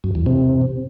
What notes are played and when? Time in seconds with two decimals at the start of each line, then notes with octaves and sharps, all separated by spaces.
0.04 F#2
0.15 E2
0.26 C3